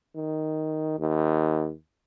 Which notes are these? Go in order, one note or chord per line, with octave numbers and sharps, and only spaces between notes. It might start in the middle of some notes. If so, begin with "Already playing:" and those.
D#3
D#2